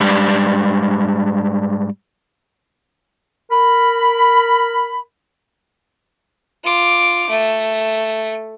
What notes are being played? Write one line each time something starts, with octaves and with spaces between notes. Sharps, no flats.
G#2 G3 D4
A#4 B5
F4 D6
A3